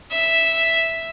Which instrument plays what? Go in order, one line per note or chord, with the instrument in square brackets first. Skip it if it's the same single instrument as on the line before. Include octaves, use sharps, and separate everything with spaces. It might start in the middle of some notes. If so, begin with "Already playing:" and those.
[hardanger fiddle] E5